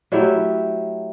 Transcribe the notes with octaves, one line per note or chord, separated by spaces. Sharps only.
F#3 A3 E4 G4